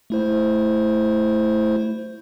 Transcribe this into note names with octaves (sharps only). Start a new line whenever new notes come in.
A3 E4 C5